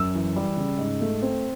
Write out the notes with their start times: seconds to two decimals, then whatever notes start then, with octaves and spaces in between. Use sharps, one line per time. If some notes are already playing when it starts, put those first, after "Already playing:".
Already playing: F#2 E6
0.15 E3
0.36 G3
0.57 C#3
0.78 G#2
1.01 A3
1.22 C4